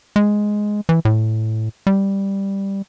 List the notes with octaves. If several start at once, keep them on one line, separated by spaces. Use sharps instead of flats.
G#3
E3
A2
G3